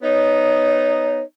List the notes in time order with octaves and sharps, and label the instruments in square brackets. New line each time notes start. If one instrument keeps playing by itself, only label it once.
[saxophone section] B3 D#4 [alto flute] C#5